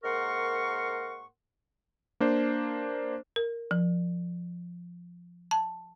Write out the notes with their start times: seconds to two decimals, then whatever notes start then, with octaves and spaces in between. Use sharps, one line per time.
0.04 G#2 A#3 A#4 F#5 C6 C#6
2.20 A#3 D4 C5
3.36 A#4
3.71 F3
5.51 A5